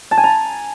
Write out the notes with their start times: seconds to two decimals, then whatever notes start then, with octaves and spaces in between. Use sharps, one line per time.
0.11 A5
0.18 G#5
0.24 A#5